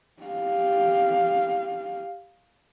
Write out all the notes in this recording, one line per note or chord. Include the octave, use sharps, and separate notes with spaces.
G4 F5